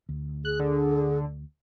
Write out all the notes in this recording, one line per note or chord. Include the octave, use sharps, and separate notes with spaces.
D2
G#4 F#6
D3